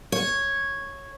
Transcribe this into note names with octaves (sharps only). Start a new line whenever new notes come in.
C#5